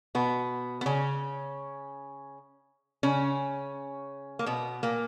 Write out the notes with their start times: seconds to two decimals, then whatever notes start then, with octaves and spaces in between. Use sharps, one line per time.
0.15 B2 B3
0.81 B3
0.86 C#3 C#4
3.03 C#3 C#4
4.39 A#3
4.46 B2 B3
4.83 A#2 A#3